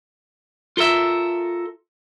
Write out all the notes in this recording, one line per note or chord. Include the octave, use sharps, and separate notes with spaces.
F4 A4 A#4 E5